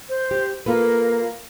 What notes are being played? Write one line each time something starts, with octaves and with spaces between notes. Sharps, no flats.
C5
G4
A#3 F4 A4 B4